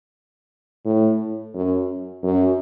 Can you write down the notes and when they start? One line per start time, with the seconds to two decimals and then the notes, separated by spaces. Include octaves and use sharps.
0.85 A2
1.54 F#2
2.23 F#2